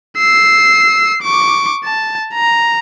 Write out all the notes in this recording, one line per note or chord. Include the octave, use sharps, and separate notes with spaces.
E6 C7
C#6 D6
A5
A#5